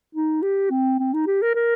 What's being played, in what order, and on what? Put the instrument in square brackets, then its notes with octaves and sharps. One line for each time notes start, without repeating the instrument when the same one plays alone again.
[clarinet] D#4
G4
C4
C4
D#4
G4
A#4
A#4